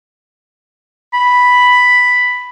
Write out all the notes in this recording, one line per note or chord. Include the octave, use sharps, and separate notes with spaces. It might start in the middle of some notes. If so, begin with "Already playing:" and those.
B5